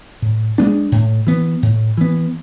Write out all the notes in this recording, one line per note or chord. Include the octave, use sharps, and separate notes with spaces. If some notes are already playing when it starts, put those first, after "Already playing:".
A2
G#3 B3 D4
A2
E3 B3
A2
E3 B3